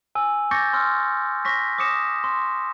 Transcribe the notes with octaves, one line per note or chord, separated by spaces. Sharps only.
G#5 E6
C#6 D6 G6 A6 A#6 C#7
C6 E6 F6
C#6 A#6 B6
D6 D#6 A#6 C#7 E7
C6